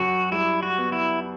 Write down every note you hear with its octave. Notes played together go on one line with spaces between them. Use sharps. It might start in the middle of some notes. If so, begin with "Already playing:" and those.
Already playing: F#2 F#3 F#4
G3 E4
F#4
B3
E4